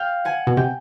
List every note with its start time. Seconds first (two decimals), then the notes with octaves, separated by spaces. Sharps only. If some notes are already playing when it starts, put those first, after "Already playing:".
Already playing: F5 G5
0.25 F#5 G#5
0.47 B2
0.57 C3 G5